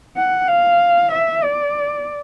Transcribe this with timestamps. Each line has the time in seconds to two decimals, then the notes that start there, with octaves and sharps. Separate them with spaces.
0.17 F#5
0.48 F5
1.12 E5
1.44 D5